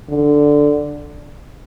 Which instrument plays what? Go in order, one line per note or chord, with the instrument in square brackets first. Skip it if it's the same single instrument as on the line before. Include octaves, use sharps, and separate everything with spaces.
[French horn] D3